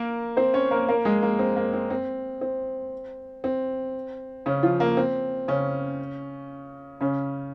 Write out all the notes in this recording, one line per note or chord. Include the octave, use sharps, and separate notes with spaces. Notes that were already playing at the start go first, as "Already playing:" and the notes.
Already playing: A#3 A#4
C4 C5
C#4 C#5
A#3 A#4
A#3 A#4
G#3 G#4
A#3
C4
A#3
C4
C4
C4
C4
C#3 C#4
F3 F4
A#3
C4
C#3 C#4
C#3 C#4